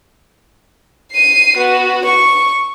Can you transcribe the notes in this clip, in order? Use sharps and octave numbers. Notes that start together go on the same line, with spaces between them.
C7 D#7
B3 F#4
C#6